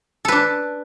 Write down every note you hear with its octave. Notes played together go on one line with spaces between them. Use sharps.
D4 A4 B4